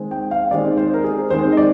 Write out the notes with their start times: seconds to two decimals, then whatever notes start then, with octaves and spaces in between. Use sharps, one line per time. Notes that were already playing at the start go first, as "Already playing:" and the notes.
Already playing: D#3 G#3 C4
0.11 G5
0.31 F5
0.51 D#3 G#3 C4 D5
0.77 C5
0.94 A#4
1.04 G#4
1.30 D#3 G#3 C4 C5
1.52 D#5
1.57 D5